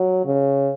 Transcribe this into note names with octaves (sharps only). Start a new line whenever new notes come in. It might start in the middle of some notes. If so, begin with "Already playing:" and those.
Already playing: F#3
C#3